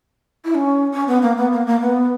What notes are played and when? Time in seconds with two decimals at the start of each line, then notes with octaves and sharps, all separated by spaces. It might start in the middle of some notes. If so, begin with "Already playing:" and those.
0.45 E4
0.55 C#4
0.93 C#4
1.08 B3
1.22 A#3
1.37 B3
1.53 A#3
1.67 A#3
1.81 B3